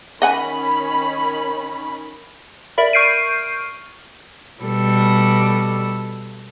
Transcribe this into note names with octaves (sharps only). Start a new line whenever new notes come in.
D#3 C#4 D#5 F#5 G#5 B5
A#4 D5 E5 B5
C#6 F6 G6 C7 D7 D#7
B2 G3 A4